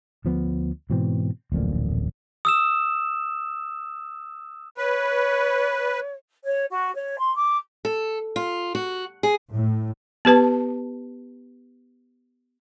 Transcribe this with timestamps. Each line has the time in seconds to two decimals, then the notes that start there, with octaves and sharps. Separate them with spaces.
0.25 D2 F3 B3
0.90 G#2 B2 E3 C4
1.52 D1 A1 F2 A#2
2.45 D#6 E6 E7
4.78 B4 C#5
6.44 C#5
6.71 F#4
6.96 C#5
7.18 C6
7.35 D6
7.85 A4
8.36 F4
8.75 F#4
9.23 G#4
9.54 A2
10.25 B3 G4 B4 A5